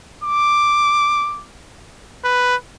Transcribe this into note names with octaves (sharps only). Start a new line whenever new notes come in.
D6
B4